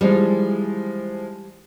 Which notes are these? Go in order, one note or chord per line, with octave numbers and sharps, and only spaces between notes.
E3 F3 G3 G#3